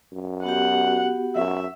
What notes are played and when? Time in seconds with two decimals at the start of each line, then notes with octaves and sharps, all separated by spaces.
0.13 F#2
0.44 B3 F#4 G4 F#5
1.36 F#2 E5 F#5 C#6